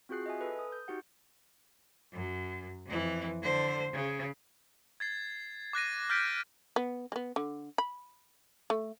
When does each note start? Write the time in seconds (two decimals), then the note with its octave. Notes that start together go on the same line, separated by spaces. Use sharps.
0.09 C4 F4 F#4 G#4 F#6 C7
0.26 D#5 E5 G#5
0.41 A4 B4
0.59 D#6
0.72 G6
0.88 D#4 F#4 G4 F#5
2.13 F#2
2.85 F2 E3
3.42 D3 C5
3.92 C#3
5.00 G#6 A6 C7
5.73 D6 F#6 A#6 D#7
6.10 F6 G6 A6 B6 D7
6.76 B3
7.12 G#3 B3
7.36 D3
7.78 B5
8.70 A3